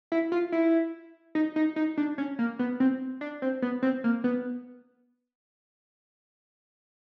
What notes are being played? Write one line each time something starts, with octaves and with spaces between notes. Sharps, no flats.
E4
F4
E4
D#4
D#4
D#4
D4
C#4
A#3
B3
C4
D4
C4
B3
C4
A#3
B3